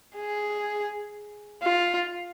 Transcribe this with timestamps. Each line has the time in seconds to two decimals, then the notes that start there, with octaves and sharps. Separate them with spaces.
0.16 G#4
1.62 F4